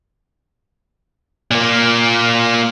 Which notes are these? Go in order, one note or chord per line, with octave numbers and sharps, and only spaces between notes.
A#2 A#3